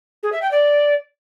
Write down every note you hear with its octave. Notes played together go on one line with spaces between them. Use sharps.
G#4
E5
G5
D5